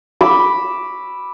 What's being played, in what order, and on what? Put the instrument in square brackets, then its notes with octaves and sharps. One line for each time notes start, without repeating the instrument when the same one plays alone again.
[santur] B5 D6 E6